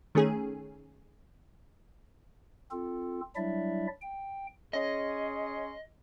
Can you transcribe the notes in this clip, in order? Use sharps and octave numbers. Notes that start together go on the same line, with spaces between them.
D#3 A3 C#4 G#4
C4 F4 A4
F#3 G3 D4 E4 D5 E5
G5
C#4 G#4 D#5 C6